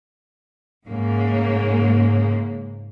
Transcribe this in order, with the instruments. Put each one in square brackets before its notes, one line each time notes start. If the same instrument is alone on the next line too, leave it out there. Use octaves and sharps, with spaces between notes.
[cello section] G#2 C#3 A#3